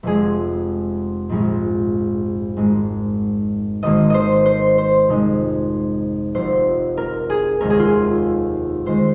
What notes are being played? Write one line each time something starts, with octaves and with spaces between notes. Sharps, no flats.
F1 F2 F3 G#3 G#4
A#1 G#2 F3 G#3
G#1 G#2 G#3
G#1 G#2 D#3 A#3 D#5
C5 D#5
C5
C5
F2 C3 G#3 D#4
F1 F2 F3 C5
A#4
G#4
F1 D#2 D#3 G#3 A#4
G#4
F4
G#4
D#2 D#3 G#3 C5